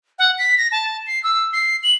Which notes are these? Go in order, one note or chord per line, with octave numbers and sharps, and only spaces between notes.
F#5
B6
A#6
A5
C7
E6
C7
F#7